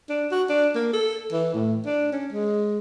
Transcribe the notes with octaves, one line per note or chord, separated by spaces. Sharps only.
D4
F#4
D4
A#3
A4
E3
A2
D4
C#4
G#3